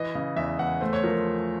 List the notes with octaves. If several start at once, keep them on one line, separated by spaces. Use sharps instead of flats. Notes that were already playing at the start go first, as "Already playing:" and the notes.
Already playing: E3 D#5
C#3
E2 E5
E2 F#5
A3 C5
C#5
F3 A#4